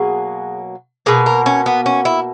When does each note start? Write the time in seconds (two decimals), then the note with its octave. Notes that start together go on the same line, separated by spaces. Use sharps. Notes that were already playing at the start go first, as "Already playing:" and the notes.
Already playing: B2 F#3 A#3 G#4
1.06 B2 A#3 G#4
1.26 A#4
1.46 C#4
1.66 B3
1.86 C#4
2.05 E4